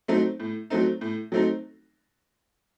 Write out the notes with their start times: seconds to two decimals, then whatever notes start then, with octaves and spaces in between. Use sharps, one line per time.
0.08 F#3 A3 C4 D#4
0.40 A2
0.70 F#3 A3 C4 D#4
1.01 A2
1.32 F#3 A3 C4 D#4